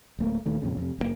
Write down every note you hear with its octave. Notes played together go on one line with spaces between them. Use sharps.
D1 A3 A#3
D#1 A#2 D#3 A3
F2 A#2 C#3
F2 C3
F#1 C3 A#3